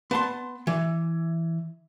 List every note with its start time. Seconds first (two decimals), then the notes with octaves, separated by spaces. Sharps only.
0.11 B3 A5 C6
0.67 E3